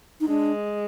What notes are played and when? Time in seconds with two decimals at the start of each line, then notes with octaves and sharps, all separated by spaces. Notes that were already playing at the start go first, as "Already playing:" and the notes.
0.21 D#4
0.28 G#3 D4